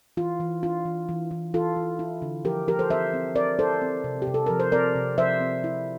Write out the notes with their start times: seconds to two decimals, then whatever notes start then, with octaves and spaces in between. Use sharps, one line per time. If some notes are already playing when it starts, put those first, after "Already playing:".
0.17 E3 F4
0.40 E3
0.63 D4 F4
0.86 E3
1.09 E3
1.31 E3
1.54 E3 F4 A4
1.76 E3
1.99 E4
2.22 D3
2.45 F3 G4 A#4
2.68 F3 G4 A#4
2.79 A4 C5
2.90 C4 C5 E5
3.14 C4
3.35 C4 A#4 D5
3.59 E4 A4 C5
3.82 C4
4.04 C3
4.22 C3 G4
4.34 A4
4.46 F3 A#4
4.60 C5
4.72 C4 A#4 D5
4.95 C3
5.18 F3 C5 E5
5.40 C4
5.64 E4